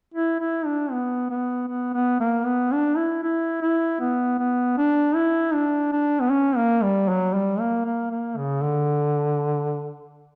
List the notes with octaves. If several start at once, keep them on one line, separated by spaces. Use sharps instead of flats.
E4
E4
D4
B3
B3
B3
B3
A#3
B3
D4
E4
E4
E4
B3
B3
D4
E4
D4
D4
B3
C#4
A#3
G3
F#3
G3
A#3
A#3
A#3
C#3
D3